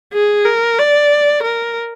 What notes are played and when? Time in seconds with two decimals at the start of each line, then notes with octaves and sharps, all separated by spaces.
0.14 G#4
0.45 A#4
0.79 D5
1.43 A#4